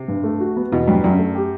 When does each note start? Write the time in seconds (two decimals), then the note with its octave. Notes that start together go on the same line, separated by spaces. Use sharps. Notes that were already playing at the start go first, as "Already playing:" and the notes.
Already playing: C3
0.08 G2
0.24 A3
0.40 F#4
0.56 B3
0.72 E2 B2
0.87 G2 F#3
1.03 F#2 D4
1.19 A3
1.35 G4